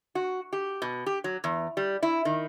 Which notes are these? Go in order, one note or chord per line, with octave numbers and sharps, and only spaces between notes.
F#4
G4
B2
G4
F#3
E2
G3
E4
D#3